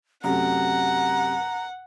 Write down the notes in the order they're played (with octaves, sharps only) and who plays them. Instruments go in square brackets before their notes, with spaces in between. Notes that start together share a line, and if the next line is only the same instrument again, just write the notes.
[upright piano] F#2 C3 A3 [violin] F#5 [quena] A#5